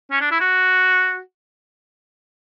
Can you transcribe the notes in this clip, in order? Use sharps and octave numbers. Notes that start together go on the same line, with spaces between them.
C#4
D4
E4
F#4